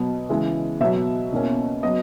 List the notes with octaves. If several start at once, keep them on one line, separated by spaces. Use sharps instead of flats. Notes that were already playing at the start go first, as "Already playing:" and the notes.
Already playing: B2 F#3 B3
C#3 E3 G#3
B2 F#3 B3 E5
E2 B2 A#3 C#4
F#3 B3 D#5